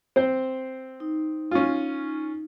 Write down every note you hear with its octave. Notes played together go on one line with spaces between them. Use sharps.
C4 C5
D#4
C#4 F4